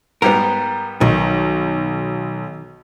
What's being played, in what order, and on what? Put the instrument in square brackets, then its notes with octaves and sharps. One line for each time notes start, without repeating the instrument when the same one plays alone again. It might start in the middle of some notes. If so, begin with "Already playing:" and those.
[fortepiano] G#2 G3 B3 [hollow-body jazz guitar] A#4
[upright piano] B1 [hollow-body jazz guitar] D#3